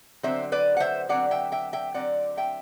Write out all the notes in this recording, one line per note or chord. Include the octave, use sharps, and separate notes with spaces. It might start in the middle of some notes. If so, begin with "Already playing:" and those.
D3 F#3 C4 C5 E5
B4 D5
F#5
C5 E5
D3 F#3 C4 D5 F#5
E5 G5
E5 G5
E5 G5
D3 F#3 C4 D5 F#5
E5 G5